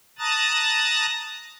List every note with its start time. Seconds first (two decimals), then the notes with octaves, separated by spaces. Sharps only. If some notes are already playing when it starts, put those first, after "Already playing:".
0.19 A5 A#5 D#6 F#6 A6